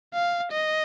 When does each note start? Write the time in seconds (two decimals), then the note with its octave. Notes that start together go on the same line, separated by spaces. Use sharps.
0.14 F5
0.53 D#5